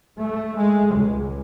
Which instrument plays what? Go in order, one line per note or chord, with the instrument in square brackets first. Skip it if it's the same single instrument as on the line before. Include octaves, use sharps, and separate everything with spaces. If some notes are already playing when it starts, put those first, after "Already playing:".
[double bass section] A3
G#3
C#2